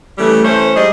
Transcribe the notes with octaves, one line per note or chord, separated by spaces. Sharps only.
C#3 E3 G3 A3
E3 A3 C#4 C5
G#2 G3 G#4 D#5